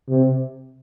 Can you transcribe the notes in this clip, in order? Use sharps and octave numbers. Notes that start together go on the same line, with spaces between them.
C3